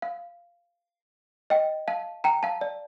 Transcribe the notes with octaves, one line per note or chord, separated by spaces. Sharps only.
F5
D#5 G5
F5 A5
G5 A#5
F5 A5
D5